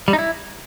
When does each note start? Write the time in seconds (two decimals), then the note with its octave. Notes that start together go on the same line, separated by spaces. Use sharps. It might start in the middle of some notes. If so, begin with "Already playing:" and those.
0.08 G3
0.13 D#4
0.19 E4